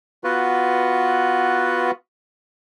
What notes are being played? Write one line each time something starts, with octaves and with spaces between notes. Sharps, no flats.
B3 F4 F#4 B4